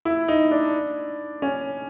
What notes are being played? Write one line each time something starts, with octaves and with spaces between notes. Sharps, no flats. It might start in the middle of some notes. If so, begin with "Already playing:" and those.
E4
D#4
D4
C#4